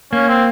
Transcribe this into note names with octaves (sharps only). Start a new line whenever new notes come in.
A#3 C#4
C4